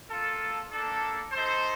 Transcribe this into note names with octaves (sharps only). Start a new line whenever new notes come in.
A#3 F4 A4
A#3 D4 A4
D#4 A4 C5